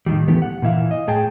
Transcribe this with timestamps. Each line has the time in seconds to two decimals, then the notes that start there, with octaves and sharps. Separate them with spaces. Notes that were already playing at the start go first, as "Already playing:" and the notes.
0.06 A2 D#3 F3 G3
0.28 A2 E3 F3 B3 G4 A4
0.42 F#5
0.62 A#2 E3 E4 F5
0.91 D#5
1.07 A2 G#4 G5 A5